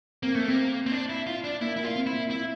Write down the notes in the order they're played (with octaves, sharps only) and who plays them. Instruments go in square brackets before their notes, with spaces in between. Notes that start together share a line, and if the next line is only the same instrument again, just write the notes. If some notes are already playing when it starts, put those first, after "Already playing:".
[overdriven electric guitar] A#3 [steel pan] C4
[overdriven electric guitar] A3 [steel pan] A#3
[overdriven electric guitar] A#3 [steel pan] C4
[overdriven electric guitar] C4
D4
E4
F4
D4
[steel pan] A#3 [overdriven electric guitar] E4
[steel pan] A#3 [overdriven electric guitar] E4
[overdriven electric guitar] F4
[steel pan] C4
[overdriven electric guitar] E4
[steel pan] A#3
[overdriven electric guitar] E4